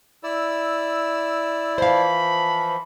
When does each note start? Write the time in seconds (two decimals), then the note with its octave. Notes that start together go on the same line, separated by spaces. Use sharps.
0.23 E4 D5 E6
1.78 E3 F3 C5 F5 B5